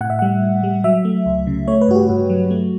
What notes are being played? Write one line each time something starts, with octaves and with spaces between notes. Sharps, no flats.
A2 F#5
E5
G3 F#5
A2
G3
F#3 E5
A3
C#2
C#3
A3 C#5
B4
G2 F#4
G4
G2 F#4
F#3
A3